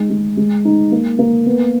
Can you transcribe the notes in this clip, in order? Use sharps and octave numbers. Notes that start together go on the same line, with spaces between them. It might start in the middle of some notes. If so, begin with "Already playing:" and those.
Already playing: G#3 D#4
G#3
G#3
D#4
A#3
A#3
B3